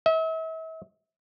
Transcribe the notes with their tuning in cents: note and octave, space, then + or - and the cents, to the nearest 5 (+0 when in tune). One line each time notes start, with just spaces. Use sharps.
E5 -40